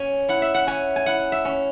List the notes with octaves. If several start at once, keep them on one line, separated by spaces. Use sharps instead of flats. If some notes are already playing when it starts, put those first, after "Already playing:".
Already playing: C#4 G#5
E4 F#5
E5
F#5
C#4 G#5
G#5
E4 F#5
E5
C#4